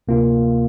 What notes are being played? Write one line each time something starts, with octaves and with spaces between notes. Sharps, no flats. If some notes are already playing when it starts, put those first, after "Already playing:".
D2 C3 A#3 F4